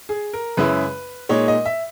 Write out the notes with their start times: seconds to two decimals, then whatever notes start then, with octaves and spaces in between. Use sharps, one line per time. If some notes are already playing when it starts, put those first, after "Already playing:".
0.09 G#4
0.33 A#4
0.57 F#2 C#3 G#3 C#4 E4 B4
1.29 A#2 G#3 D#4 C#5
1.48 D#5
1.65 E5